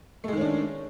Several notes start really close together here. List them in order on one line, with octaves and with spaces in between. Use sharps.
A3 G#3 D#3 C#4 D4